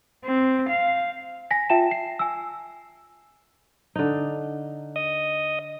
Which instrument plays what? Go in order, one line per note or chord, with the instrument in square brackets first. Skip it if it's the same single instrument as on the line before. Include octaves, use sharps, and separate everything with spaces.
[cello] C4
F5
[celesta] G#5 A#6 B6
F4 E5 G5 A5 E7
C7
G#5 E6
[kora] D3 D#4
[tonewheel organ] D#5 D#6